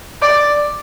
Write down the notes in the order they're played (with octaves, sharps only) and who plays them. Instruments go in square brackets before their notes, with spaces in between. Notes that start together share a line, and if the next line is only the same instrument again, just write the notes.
[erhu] D5